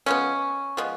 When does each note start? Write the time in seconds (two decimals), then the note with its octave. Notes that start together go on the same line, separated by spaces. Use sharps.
0.06 F3 G#3 B3 C#4
0.77 F3 G#3 B3